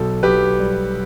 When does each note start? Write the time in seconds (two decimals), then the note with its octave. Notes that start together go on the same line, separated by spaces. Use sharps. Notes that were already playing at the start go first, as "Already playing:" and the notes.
Already playing: B1 B2 A4
0.23 B1 G4 B4
0.59 G3